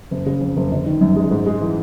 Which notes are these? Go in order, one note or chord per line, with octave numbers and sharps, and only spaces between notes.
F#1
C#3
F2
F#1
G1
D#3
F#2
G#3
G#2
G#3
E3